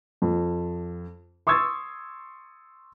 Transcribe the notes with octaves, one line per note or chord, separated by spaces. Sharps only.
F2
C6 C#6 D#6 E6 G#6 A6